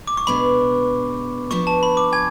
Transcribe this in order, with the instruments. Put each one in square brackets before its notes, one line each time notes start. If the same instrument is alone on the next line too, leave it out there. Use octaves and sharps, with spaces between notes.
[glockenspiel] D6
C#6
[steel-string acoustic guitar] B2 G#3 B3 D4 [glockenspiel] B5
[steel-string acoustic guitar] F3 B3 D4 [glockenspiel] C#6
[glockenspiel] A5
B5
D6
G#5 G#6